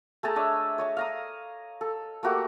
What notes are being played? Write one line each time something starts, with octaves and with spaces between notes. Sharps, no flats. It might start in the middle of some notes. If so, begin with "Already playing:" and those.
A3 G#4 A5 A#5
D4 C#5 D#5 E5
C#5 D#5 A5
F5 A#5 D#6
A4
A3 A#3 F#4 G4